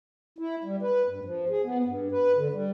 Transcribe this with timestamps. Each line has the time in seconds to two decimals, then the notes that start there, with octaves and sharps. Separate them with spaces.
0.38 E4
0.64 G3
0.82 B4
1.07 G2
1.25 F3
1.49 G#4
1.64 B3
1.86 G2
2.12 B4
2.36 D3
2.53 G3